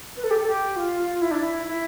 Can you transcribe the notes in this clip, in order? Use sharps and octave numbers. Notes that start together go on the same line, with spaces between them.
B4
A4
G4
A4
G4
F4
E4
D4
E4
E4